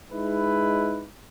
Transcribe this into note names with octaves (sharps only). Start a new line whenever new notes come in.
G#3 D#4 E4 B4